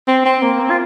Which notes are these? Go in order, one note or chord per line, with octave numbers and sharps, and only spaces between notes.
C4
C4
A#3
C4
F4